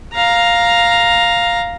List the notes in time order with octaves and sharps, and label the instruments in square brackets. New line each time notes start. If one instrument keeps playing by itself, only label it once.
[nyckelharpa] F5 A#5